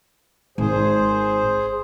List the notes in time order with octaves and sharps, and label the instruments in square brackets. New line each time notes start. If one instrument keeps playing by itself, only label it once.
[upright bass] G#1 [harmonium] G#4 C5